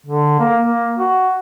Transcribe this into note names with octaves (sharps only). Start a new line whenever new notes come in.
D3
A#3
A#3
F#4